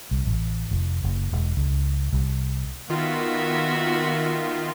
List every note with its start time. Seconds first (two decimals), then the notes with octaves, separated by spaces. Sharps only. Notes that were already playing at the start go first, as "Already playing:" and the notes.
0.11 C2
0.27 A1
0.71 F1
1.04 F#1
1.32 E1
1.57 C#2
2.13 C2
2.90 D#3 B3 F4 F#4 E5